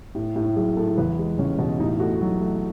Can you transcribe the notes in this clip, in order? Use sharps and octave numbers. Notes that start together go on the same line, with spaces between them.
A2
A2
F#3 G#4
A2 A4
E2 B4
G#3
E2 C#4
B2
A2 D#4
A3 F#4
F#3
A3